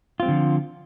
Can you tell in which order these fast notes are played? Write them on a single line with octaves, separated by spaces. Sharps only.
F4 C4 G3 D3 F3